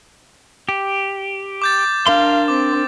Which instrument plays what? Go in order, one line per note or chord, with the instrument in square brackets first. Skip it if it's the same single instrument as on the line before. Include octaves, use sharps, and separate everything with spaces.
[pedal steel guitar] G4
[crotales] D6 G6 A6
[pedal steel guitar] D4 A#4 C6 [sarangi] F5
[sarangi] C4 [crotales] D6